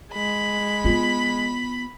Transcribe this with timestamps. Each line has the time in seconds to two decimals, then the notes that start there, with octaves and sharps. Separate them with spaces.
0.13 G#3 B5
0.84 B3 F4